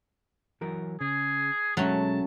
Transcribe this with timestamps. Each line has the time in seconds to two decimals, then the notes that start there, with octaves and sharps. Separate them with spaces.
0.61 E3 F#3 A#4
1.01 C#3 G#4
1.77 B1 F#3 G#3 A3 C#4 A5